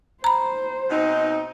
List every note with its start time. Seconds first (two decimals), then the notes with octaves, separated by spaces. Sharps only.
0.24 C5 A#5 B5
0.90 B2 C4 D#4